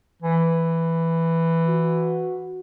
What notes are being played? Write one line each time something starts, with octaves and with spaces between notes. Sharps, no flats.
E3
F#4